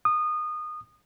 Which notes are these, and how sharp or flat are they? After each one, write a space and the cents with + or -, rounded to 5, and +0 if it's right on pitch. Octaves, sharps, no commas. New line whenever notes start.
D#6 -25